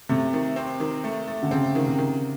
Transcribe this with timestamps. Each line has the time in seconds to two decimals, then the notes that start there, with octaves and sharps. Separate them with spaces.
0.09 C3 A3
0.33 D#3
0.56 C4
0.80 D#3
1.04 A3
1.27 A3
1.43 D3
1.51 C#3 C4
1.75 D#3
1.86 C3
1.98 D#3